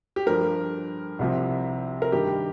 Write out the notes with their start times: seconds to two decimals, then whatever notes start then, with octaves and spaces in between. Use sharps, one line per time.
0.16 G4
0.26 G2 F3 A#4
1.19 C2 C3 F3
2.02 A#4
2.12 G2 D#3 G3 G4